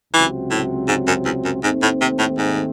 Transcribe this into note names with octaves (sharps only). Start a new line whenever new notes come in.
C#2 C3 E3 F#3 C4
A2
G#2
F#2
E2
F#2
D#2 G#2 D#3 A3 C4
A2
C3
A2
G#2